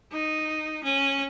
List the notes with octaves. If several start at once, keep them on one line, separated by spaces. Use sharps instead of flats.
D#4
C#4